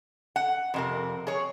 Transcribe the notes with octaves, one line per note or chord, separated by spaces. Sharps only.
F#5
F2 C3 A#4
G#4 C#5